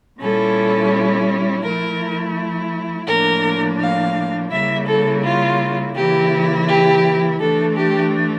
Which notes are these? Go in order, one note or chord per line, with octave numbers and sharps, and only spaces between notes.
A#2 G3 C#4 E4 A4
F3 A3 E4 A#4
A2 F3 A#3 D4 A#4
F5
C#3 G3 A#3 E4 E5
A4
F4
C#3 E3 A#3 E4 G4
G4
E3 A3 D4 A4
G4